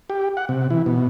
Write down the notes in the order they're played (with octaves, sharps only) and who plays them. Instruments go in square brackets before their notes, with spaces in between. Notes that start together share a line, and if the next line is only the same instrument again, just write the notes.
[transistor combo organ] G4
F#5
C3
E3
B2